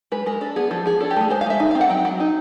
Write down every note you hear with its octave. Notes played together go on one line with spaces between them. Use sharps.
G#3 B4
G#3 A#4
D4 A4
B3 G#4
F3 A4
F3 G#4
D4 A4
G4
A3 G#4
G#3 C5
F5
G#3 E5
D#4
F5
C4
F#5
F#3 G5
F#3
D#4